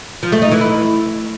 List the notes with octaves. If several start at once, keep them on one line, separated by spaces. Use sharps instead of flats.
F3
A3
D#4
E3
E4